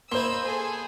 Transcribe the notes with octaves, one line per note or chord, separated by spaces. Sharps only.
A#3 E4 C5 D#5 C6 E6 G7
G#4 A4 G#5